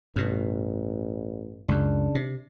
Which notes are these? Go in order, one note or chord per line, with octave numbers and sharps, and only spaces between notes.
A1 G2 B2
C#2 F#2 C#3 D4
C3